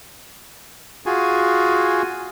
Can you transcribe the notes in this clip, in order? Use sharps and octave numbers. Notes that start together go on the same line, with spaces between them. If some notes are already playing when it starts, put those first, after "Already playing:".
F4 F#4 G#4 G#5